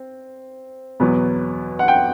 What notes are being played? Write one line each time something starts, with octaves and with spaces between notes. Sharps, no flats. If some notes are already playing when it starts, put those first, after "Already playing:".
Already playing: C4
E2 B2 F#3 B3
F#5
G5